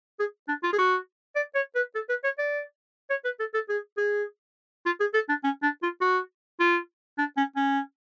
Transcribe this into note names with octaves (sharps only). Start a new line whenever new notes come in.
G#4
D4
F4
G#4
F#4
D5
C#5
B4
A4
B4
C#5
D5
C#5
B4
A4
A4
G#4
G#4
F4
G#4
A4
D4
C#4
D4
F4
F#4
F4
D4
C#4
C#4